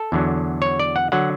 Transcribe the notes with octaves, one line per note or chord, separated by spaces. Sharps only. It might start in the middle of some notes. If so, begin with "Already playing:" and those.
Already playing: A4
E2 D3 F#3
C#5
D5
F#5
D3 F#3 F#5